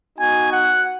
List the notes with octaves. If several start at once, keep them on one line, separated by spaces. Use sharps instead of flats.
B3 D#4 F#4 G#5
F#5